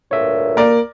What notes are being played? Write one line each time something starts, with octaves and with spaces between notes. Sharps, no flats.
D2 G2 A#2 C#5 E5
A#3 A#4 D5